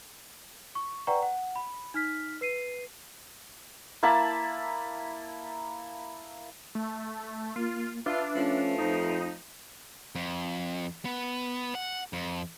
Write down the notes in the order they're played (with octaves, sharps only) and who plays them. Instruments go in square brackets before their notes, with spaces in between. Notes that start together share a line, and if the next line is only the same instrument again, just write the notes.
[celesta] C#6
B4 D5 F#5 G5 A#5 C#6
F#5
B5
D#4 F6 B6
B4 C7 D#7
[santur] A#3 E4 A5 B5
[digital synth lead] A3
[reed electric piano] A#3 [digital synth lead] F4
[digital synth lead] D4 [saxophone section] F4 [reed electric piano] B4 E5
[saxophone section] F3 A3 [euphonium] C#4
[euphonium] F2 [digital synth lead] D#4
[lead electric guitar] F2
B3
F#5
F2